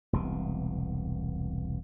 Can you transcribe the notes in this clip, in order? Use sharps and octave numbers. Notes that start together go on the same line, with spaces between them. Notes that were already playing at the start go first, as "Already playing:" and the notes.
E1 C2 B2